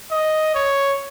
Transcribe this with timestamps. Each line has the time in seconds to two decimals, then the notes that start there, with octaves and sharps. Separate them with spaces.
0.11 D#5
0.55 C#5